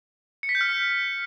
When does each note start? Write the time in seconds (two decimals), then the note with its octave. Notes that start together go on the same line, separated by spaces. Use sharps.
0.43 C#7
0.49 B6
0.55 G6
0.61 F6